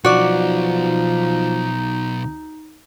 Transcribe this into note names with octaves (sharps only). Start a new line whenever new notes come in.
B1 F3 D#4 F#4 D5